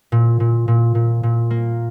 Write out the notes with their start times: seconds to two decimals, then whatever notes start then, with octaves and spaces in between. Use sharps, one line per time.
0.12 A#2
0.40 A#2
0.68 A#2
0.95 A#2
1.23 A#2
1.51 A#3